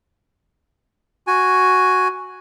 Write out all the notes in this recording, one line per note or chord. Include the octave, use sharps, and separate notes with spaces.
F#4 G#5